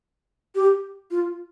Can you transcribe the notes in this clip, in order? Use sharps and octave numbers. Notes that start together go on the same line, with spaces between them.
G4
F4